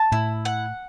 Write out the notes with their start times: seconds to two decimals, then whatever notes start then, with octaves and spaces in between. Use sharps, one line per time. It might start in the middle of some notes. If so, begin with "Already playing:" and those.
Already playing: A5
0.12 A2 E4
0.45 F#5